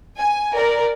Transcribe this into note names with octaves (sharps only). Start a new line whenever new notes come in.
G#5
A#4 D5